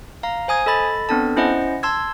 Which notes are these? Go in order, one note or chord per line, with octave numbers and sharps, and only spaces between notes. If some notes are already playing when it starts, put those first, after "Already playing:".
F5 A#5
C5 G#5 D#6 G#6
A4 D#5 B5 A6
B3 C4 D4 A4 A5
C#4 E4 C5 D#5 F#5
A5 C6 E6 G#6